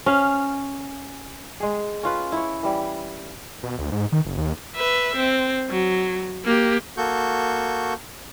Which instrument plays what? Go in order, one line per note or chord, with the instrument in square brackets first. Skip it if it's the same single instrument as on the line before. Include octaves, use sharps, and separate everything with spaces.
[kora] C#4 F5
G#3 G#4
C#4 F4 B4
E4 C#5
E3 G3
[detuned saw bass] B2
D2
G#2
D#3
F#1
D#2
[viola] B4 E5
C4
F#3
A#3 G4
[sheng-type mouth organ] A#3 F#4 A4 C#6 G6